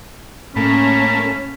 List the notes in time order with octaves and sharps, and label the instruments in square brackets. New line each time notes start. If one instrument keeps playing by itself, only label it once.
[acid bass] A2 [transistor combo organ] A3 A#3 [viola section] C#4 [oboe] B5